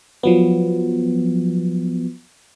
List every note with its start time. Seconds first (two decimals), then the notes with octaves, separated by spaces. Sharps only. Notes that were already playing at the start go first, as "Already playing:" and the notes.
0.23 F3 F#3 B3